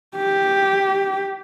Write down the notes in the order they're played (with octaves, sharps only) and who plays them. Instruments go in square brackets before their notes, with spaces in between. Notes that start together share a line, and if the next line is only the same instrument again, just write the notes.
[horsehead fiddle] G4